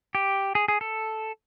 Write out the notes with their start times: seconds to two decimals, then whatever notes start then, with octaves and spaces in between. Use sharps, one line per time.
0.15 G4
0.55 G#4
0.68 G#4
0.81 A4